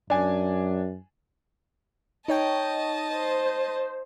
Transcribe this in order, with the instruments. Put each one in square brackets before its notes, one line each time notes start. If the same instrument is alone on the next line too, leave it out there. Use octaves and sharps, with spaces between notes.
[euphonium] F#2 [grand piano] D4 G#5
[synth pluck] D#4 C#5 G5 [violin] D#5 A5
[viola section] C5